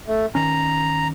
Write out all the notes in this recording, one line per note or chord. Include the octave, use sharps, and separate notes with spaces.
A3
D#3 C#4 A#5